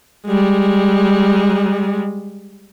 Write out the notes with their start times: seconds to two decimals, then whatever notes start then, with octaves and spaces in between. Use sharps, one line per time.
0.26 G3 G#3